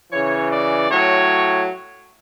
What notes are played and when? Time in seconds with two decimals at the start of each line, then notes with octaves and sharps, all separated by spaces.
0.11 C#3 E3 C#5
0.51 D5
0.90 A2 F#3 C#5